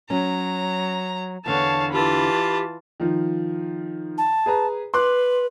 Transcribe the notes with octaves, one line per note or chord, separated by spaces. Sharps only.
F#3 C#4 A#5
E2 D3 D4 C#5 F5 A5
E3 F4 G4 A5 B5
D#3 F3
A5
G#4 B4 A#5
B4 C6 D6 F#6